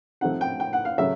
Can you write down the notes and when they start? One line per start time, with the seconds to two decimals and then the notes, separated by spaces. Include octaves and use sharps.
0.21 F3 A3 C4 D#4 F#5
0.41 G5
0.60 G5
0.73 F#5
0.85 F5
0.98 C#3 F#3 A3 C#4 E5